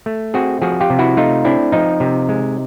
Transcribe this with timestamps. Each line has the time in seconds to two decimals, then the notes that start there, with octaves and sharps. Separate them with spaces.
0.06 A3
0.34 C4 F#4 G#4
0.62 F3 F#4 G#4
0.80 F4 G4
0.90 C3
0.99 E4 F#4
1.17 A3 D#4 F4
1.45 C4 D4 E4
1.72 F3 D#4
2.00 C3
2.29 G#3